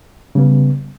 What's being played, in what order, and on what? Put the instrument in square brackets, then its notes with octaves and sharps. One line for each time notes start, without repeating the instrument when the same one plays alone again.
[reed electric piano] C#3 G3 B3